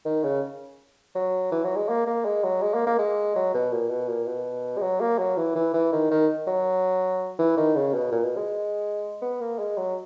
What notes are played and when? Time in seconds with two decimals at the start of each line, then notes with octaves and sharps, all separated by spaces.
0.06 D#3
0.24 C#3
1.15 F#3
1.52 E3
1.64 F#3
1.76 G#3
1.89 A#3
2.07 A#3
2.25 G#3
2.44 F#3
2.62 G#3
2.74 A#3
2.87 A#3
2.99 G#3
3.36 F#3
3.54 B2
3.73 A#2
3.90 B2
4.09 A#2
4.27 B2
4.77 G#3
4.82 F#3
5.01 A#3
5.19 F#3
5.37 E3
5.55 E3
5.74 E3
5.92 D#3
6.11 D#3
6.47 F#3
7.39 E3
7.57 D#3
7.76 C#3
7.94 B2
8.12 A#2
8.24 B2
8.37 G#3
9.22 B3
9.40 A#3
9.59 G#3
9.77 F#3